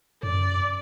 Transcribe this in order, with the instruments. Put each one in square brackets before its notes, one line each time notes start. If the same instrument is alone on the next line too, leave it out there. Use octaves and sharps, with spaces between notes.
[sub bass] F#2 [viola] D5